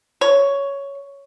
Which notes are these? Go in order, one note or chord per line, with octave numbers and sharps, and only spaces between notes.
C#5